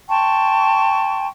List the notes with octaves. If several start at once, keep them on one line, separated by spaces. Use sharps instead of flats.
G5 A5 C6 C#6